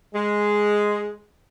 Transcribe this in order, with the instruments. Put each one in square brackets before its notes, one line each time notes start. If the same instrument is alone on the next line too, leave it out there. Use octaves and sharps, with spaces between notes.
[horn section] G#3